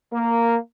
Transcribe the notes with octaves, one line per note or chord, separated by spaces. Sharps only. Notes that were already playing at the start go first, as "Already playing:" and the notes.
A#3